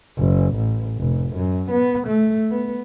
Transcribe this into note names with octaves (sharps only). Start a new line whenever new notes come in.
F#1
A1
F1
F#2
B3
A3
B3